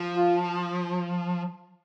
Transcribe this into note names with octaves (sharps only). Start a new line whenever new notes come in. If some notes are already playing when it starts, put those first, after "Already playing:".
Already playing: F3
F4